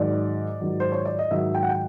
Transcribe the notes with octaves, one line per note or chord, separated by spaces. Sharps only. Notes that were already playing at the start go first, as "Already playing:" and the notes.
Already playing: G#2 D#3 F#3 D5
G#2 D#3 F#3
C5
C#5
D5
D#5
G#2 D#3 F#3 E5
G5
F#5
G5